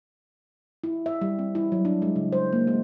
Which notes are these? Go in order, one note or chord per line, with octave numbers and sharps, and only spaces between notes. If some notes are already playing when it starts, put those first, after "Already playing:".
E4
E5
G3
C4
E4
F#3
D4
G#3
C#3
C5
A#3
G#3